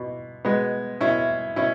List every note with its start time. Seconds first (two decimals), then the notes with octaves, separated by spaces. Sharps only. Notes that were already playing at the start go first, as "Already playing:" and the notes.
Already playing: B2
0.45 B2 G#3 B3
1.01 B2 C#4 E4
1.56 B2 C#4 E4